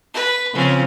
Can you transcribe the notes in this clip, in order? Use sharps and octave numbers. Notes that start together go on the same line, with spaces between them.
B4
C#3 F3 C4 C#4